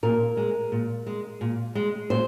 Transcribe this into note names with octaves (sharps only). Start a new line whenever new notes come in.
A#2 A#4
G#3
A#2
G#3
A#2
G#3
A#2 C5